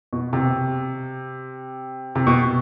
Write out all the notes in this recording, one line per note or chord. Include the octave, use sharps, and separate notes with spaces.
B2
C3
C3
B2